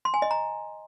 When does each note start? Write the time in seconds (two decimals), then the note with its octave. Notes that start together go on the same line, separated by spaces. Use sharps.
0.05 C6
0.14 G#5
0.22 D#5
0.31 A#5